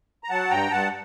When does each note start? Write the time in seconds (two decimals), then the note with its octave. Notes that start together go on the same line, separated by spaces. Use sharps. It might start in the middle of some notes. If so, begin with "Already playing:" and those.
0.24 A#5
0.30 F#3 F#5 A5
0.50 G2 G5 A#5
0.71 G2 F#5 A5